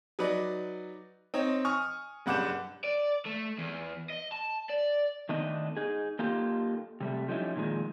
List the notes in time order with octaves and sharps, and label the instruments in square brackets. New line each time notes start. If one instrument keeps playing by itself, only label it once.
[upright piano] F#3 D#4 B4 D5
C4 D#4 C#5
G#5 C#6 D#6 F6
F#1 G2 F#5 D6 G6 E7
[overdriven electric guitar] D5
A3
E2
D#5
A5
D5
[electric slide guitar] D#3 A3 B3 D4 D#4 D#5
D#4 G#4
A#3 D#4 F4 G4 A4
C3 G3 A3
F3 G3 C#4 D#4 E4
A#2 D#3 F3 G#3